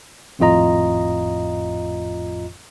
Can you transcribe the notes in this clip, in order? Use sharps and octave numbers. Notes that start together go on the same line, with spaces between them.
G#1 F2 A2 F4 D#5 A#5